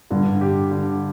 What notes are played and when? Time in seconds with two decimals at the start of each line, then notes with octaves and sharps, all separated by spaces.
0.11 G2 D3
0.41 G4
0.71 D3